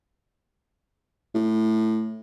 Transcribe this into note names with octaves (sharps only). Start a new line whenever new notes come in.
A2